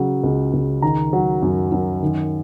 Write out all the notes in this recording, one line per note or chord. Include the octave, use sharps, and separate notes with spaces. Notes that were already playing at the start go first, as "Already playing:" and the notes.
Already playing: C#3 F#3
C#2
C#2
D#3 A#5
F#3
F#2
F#2
D#3